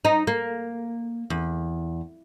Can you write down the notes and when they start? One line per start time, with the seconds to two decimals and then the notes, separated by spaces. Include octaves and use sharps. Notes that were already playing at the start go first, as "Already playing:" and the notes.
0.05 D#4
0.27 A#3
1.30 E2